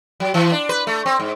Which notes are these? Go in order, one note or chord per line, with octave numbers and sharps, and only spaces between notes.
F#3
E3
D4
B4
A3
C4
G#2